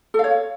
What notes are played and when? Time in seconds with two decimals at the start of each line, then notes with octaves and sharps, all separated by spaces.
0.14 A4
0.19 F5
0.24 C#5